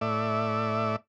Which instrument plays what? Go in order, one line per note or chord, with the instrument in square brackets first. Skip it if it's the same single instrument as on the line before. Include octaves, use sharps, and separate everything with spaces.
[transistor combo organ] A2 D5 E5